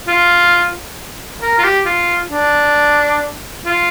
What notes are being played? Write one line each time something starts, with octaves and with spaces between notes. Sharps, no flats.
F4
A#4
F4
G4
F4
D4
F4